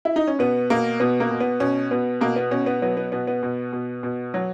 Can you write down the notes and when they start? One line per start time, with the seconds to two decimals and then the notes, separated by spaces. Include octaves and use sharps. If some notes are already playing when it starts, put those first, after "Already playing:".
0.05 E4
0.16 D#4
0.27 C#4
0.39 B2 B3
0.70 B2 A#3
1.00 B2 B3
1.20 A#3
1.31 B2
1.40 B3
1.60 B2 C#4
1.91 B2 B3
2.21 B2 A#3
2.36 B3
2.51 B2 C#4
2.66 B3
2.82 F#3 B3
2.97 B3
3.12 B2 B3
3.27 B3
3.43 B2
3.73 B2
4.03 B2
4.34 F#3